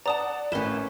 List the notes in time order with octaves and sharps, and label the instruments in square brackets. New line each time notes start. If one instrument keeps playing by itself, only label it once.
[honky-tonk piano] D5 F#5 A5 [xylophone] A#5 D#6 E7
[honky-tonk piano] G#1 A2 [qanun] C#4 B4 [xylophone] A#4 E7